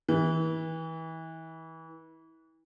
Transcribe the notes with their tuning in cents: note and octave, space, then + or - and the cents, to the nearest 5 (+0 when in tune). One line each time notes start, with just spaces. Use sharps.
E3 -30